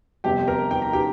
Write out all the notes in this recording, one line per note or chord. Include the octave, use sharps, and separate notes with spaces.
G1 F2 C3 G4 G5
A#4 A#5
G5
A#5
G4 G5